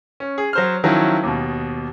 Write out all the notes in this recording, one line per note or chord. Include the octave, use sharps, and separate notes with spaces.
C#4
G#4
F#3 C5 F6
D#3 F3 F#3 C#4 E4
D#2 B2